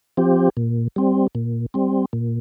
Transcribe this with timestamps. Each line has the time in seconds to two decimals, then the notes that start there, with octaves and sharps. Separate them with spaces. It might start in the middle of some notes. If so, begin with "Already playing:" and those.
0.17 F3 C4 G4
0.57 A#2
0.96 G3 C4
1.35 A#2
1.74 G3 C4
2.13 A#2